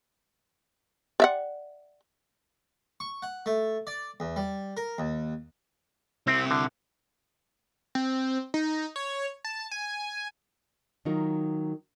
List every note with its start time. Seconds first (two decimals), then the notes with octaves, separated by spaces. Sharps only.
1.20 D5 E5 F#5
3.00 C#6
3.22 F#5
3.46 A3
3.87 D5
4.20 E2
4.36 G3
4.77 A#4
4.98 D#2
6.27 C3 C4 E4
6.51 D3
7.95 C4
8.54 D#4
8.96 C#5
9.45 A5
9.71 G#5
11.05 D#3 F#3 D#4 F4 A#4